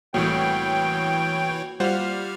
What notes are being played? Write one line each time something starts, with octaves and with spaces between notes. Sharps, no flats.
C2 A2 E3 A#3 F#4 C#5 G5
G3 F4 C5 F#5 F6